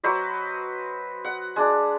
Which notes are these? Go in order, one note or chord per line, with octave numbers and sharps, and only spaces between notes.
F#3 B4 C5 D#5
F#5
G#3 D4